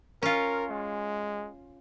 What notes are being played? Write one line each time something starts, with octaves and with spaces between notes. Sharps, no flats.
C#4 F4 A#4
G#3